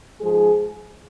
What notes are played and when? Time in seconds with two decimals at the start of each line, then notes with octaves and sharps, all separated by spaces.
0.21 G#2 F3 G#3 G#4